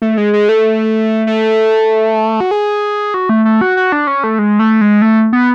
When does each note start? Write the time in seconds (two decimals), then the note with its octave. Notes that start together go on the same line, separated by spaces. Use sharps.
0.02 A3
0.18 G#3
0.33 G#3
0.49 A3
1.27 A3
2.41 F#4
2.51 G#4
3.14 F#4
3.29 A3
3.45 A3
3.61 F#4
3.77 F#4
3.92 D4
4.07 C#4
4.24 A3
4.39 G#3
4.59 A3
4.81 G#3
5.02 A3
5.33 B3